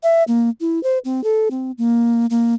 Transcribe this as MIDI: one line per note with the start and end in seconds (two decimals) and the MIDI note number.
0.03 0.23 76
0.28 0.50 58
0.61 0.82 64
0.83 0.98 72
1.05 1.23 60
1.24 1.48 69
1.51 1.71 60
1.78 2.26 58
2.30 2.54 58